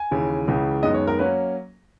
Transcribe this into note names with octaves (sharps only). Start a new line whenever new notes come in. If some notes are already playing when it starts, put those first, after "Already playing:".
Already playing: G#5
D#2 C#3 E3
C#2 C#3 E3
F#2 D#3 G#3 B3 D#5
C#5
A#4
F#3 A#3 C#4 B4